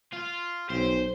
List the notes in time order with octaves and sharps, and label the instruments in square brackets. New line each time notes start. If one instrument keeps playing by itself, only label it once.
[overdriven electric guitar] F4
[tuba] B1 [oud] C4 C#4 [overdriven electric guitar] C5